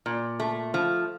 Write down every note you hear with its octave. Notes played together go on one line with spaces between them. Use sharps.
A#2
A3
F3